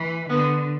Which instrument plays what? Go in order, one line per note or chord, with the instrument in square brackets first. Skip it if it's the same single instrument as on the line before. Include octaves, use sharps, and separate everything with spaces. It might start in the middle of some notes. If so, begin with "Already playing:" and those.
Already playing: [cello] E3
[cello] D3 [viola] B3